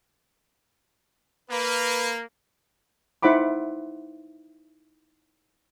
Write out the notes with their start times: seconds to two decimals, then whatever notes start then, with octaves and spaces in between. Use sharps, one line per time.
1.50 A#3 B4
3.22 D#4 E4 C5 F#5 B5 D6